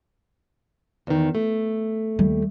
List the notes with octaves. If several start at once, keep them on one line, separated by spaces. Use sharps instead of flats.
E2 D#3
A3
D#2 G3